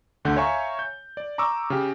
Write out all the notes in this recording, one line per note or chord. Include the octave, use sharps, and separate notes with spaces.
D2 D3 F#5 G6
C#5 E5 F5 G#5 A#5 C#6
G6
D5
A#5 C#6 D6 E6
C#3 G4